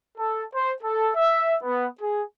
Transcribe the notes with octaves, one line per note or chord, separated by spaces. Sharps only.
A4
C5
A4
E5
B3
G#4